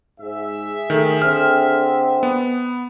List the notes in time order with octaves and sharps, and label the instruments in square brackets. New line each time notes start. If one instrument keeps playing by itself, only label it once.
[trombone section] G#2 [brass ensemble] G#4 E5
[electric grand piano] D#3 [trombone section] A3
[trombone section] D3 C4 [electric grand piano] F6
[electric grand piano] B3